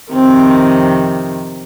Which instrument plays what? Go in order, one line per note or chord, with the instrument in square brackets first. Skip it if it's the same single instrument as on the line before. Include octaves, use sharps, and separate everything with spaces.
[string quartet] F2 C3 D#3 C4